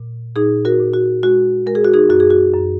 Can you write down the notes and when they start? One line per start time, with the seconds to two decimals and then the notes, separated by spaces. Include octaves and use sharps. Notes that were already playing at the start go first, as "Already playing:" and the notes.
Already playing: A#2
0.36 A#2 D#4 G#4
0.65 F#4 A#4
0.80 A#2
0.94 F#4
1.23 G#3 F#4
1.66 G#3 A#4
1.75 G#4
1.84 F#4
1.94 D#4 G#4
2.09 F#2 F#4
2.20 G#4
2.31 F#4
2.53 F#2